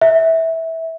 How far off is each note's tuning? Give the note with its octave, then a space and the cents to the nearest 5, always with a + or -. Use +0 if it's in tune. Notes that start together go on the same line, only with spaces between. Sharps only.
E5 -15